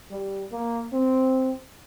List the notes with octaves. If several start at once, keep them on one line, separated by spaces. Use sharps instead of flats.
G3
A#3
C4